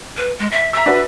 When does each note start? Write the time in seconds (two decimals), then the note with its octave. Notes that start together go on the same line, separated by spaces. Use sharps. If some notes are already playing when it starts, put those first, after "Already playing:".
0.17 B4
0.39 G#3
0.51 E5
0.73 E5 A#5 E6
0.86 D4 F#4 B4